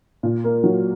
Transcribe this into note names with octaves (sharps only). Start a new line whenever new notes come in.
A#2
A#3
F#3